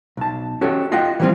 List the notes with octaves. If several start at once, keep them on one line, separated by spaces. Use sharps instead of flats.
B1 A5
C#4 F#4 G4 A4 C#5
F4 D#5 F#5 G5
E3 F3 G3 A#3 C4 F4